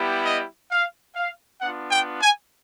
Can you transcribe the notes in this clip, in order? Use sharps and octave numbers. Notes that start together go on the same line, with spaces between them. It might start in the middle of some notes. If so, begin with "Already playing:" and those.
Already playing: G3 B3 E4 G4
D#5
F5
F5
B3 D4 F4 F#5
G5
G#5